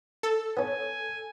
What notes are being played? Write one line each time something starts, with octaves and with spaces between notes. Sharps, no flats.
A4
B3 C#4 G#5